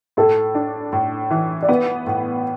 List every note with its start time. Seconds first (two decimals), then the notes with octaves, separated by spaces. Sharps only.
0.17 A2 A4
0.55 D4
0.93 A2
1.31 E3
1.63 D5
1.69 B3 B4
2.06 A2